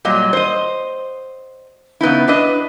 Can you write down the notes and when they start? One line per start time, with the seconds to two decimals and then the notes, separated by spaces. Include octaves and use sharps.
0.05 A#2 F#3 G3 D#5
0.33 C5 D#5
2.01 C#3 B3 D#4 E4
2.27 D4 B4 D#5